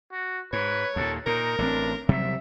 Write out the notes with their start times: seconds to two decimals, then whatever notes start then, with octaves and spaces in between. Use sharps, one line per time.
0.12 F#4
0.53 G#2 B4 C#5
0.96 D#2 A#2 A4
1.26 A#2 D#4 A#4
1.58 A1 C#3 C4 D4
2.09 C3 F#3 G3 E5